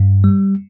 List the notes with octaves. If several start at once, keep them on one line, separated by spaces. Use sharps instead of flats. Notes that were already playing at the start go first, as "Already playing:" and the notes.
Already playing: G2
G3